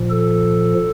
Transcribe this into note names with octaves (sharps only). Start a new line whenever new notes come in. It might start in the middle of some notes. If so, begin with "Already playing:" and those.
Already playing: A#2 F3
A4